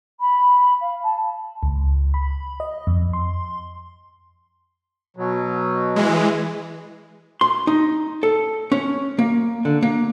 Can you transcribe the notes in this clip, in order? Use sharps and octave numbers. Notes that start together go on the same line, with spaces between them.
B5
F5
A5
C#2
B5
D#5
F2
C6
B2 F#3
E3 G#3
C6
D#4
A4
C#4
A#3
D3
A#3